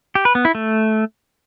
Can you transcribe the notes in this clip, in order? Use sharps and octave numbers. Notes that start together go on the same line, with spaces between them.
G4
B4
B3
E4
A3